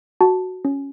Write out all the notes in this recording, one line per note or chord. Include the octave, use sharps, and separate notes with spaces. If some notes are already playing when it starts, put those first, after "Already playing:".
F#4 A5
C#4